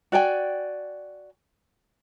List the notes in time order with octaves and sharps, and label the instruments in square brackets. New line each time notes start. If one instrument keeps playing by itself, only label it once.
[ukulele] F#4 D5 G5 G#5